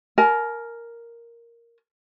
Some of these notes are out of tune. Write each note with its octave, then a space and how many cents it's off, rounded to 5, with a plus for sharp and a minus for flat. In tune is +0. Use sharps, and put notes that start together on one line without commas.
A#4 +0 G#5 +40